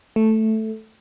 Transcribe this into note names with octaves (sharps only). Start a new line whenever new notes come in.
A3